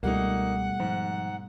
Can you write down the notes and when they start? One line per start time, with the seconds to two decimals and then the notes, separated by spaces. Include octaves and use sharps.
0.03 C#2 B2 G3 A3 A#3 D#4 F#5
0.80 G#2 F3